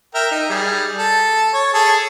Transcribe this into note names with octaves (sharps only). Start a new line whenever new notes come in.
A#4 E5 G5
D#4
G3 G#4
A4
C#5
G#4 A4